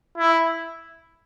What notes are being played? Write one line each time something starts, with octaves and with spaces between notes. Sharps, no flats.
E4